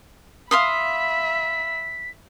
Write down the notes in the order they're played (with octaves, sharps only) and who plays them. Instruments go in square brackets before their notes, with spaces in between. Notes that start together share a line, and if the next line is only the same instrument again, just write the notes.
[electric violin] E5 B5 [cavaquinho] F5 C6 D#6 [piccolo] B6